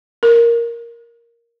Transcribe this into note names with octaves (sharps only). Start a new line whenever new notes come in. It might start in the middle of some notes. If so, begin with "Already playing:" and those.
A#4